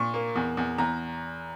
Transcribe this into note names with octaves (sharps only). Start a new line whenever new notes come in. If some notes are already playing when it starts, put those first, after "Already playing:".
Already playing: A#2 C#6
A#3
E2
E2
E2 A#5